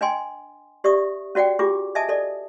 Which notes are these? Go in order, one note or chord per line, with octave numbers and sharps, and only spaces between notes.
D4 D#5 G5 G#5 C6
G4 D5 E5 C#6 D#6
C#4 F#4 D5 F#5 G5
D4 F4 G4 G#4 D6
D#5 E5 G#5 A5 D#6
A4 D5 D#5